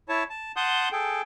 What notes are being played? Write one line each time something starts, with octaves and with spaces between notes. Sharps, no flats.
E4 C#5 A5
A5
F#5 A5 C6 D#6 G6
G#4 A4 G5